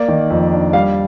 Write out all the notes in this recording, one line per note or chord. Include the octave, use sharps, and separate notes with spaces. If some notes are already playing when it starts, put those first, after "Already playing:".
Already playing: A#3 D5
D#3
F2
D4
G3 F5